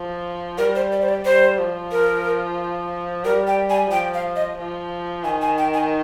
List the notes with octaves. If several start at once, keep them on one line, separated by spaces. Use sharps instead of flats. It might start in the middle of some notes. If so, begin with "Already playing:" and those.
Already playing: F3
G3 A#4
C5
D5
C5
D5
G3 C5
F3
A#4
G3 A#4
G5
G#5
F3 G5
F5
D#5
F3
D#3 G#5
G#5
G5
G#5